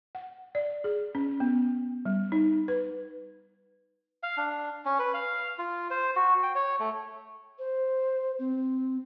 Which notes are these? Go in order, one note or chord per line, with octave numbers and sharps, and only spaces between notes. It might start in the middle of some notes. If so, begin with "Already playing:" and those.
F#5
D5
G#4
C#4
B3
G3
D#4
B4
F5
D4
C#4
B4
F5
F4
C5
F#4
G5
C#5
A3
C5
C4